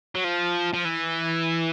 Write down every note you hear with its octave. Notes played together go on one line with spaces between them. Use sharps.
F#3
F3
F3
E3